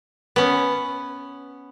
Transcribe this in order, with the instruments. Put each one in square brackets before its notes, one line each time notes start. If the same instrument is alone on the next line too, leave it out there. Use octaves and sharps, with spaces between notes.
[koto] B3 C#4